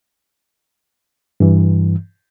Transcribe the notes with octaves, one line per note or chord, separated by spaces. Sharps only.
G2 E3